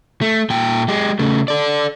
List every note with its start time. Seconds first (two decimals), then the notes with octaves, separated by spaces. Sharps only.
0.21 A3
0.50 A#2 G5
0.88 G#3 G4
1.19 C#3 A3
1.48 A4 D5